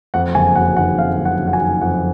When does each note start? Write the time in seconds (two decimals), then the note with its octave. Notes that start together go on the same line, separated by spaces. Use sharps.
0.14 F2 F#5
0.35 F#1 G#5
0.56 F#3 F#5
0.77 D#3 F#5
0.98 F2 F5
1.18 F#1
1.25 F#5
1.39 F#3
1.47 F#5
1.53 G#5
1.61 D#3
1.81 F2 F#5